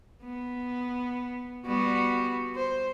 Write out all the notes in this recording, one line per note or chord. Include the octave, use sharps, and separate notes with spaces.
B3
G3 B3 F#4
C5